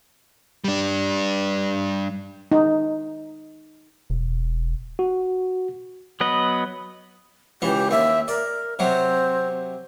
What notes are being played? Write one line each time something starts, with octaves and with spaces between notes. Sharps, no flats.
G3 D4
D#4
E1
F#4
F#3 B3 B4 D#5
C#2 E3 G4
D#2 E5
A#4 D5
C3 F#3 C4